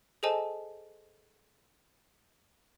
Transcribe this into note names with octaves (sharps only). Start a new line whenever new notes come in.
G#4 A4 C5 D#5 G#5 A5